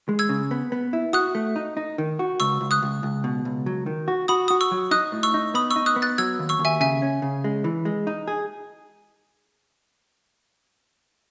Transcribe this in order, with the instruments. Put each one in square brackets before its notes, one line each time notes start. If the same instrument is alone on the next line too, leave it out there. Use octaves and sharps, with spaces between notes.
[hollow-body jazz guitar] G#3
[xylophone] E6 G#6
[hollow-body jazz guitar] C#3
B3
B3
E4
[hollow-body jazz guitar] F#4 [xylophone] D#6 F#6
[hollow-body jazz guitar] A3
D#4
D#4
D#3
F#4
[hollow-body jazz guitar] C#2 [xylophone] C#6 E6
[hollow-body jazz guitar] C#2
[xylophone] D#6 F#6
[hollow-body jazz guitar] C#2
C#2
B2
C#2
F#3
D#3
F#4
[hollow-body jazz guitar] F#4 [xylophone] B5 D#6
[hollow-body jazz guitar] F#4 [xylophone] D#6
[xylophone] C#6 E6
[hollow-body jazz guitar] F#3
[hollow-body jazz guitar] D#4 [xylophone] D#6 F#6
[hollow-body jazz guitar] A2
[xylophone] C#6 E6
[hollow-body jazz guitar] D#4
[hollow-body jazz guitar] B3 [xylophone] B5 D#6
[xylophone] C#6 E6
[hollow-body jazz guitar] D#4
[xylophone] D#6 F#6
[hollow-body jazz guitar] B3
[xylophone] F#6 A6
[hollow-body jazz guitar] F#3 [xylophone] E6 G#6
[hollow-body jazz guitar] D#2
[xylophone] C#6 E6
[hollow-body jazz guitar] D#2
[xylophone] E5 G#5
[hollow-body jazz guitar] C#3 [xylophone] E5 G#5
[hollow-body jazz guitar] C#4
C#3
G#3
E3
G#3
D#4
G#4